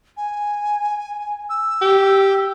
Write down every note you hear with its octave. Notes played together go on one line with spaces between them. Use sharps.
G#5
E6
G4